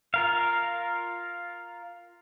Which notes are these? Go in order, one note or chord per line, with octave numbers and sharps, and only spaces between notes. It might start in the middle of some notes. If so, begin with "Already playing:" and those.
F4 A#4 F5